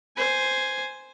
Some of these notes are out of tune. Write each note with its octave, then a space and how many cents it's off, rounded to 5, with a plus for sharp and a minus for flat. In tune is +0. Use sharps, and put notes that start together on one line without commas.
C5 +0 G#5 +0